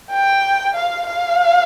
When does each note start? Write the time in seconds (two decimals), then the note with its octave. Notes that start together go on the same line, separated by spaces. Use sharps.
0.10 G5
0.75 F5
1.07 F5